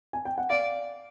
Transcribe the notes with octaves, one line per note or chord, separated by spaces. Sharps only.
G#5
G5
F#5
D5 F5